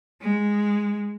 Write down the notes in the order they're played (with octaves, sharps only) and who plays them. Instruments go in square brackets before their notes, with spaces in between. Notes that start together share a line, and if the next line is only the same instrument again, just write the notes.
[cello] G#3